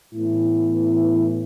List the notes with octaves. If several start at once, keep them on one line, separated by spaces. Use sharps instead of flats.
A2 E3 B3 E4